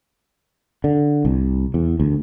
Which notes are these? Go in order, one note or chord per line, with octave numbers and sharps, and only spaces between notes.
D3
C2
E2
D2